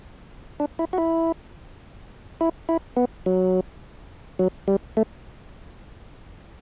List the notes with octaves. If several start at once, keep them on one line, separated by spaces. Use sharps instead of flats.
D4
E4
F#4
E4
E4
E4
B3
F#3
F#3
G3
A3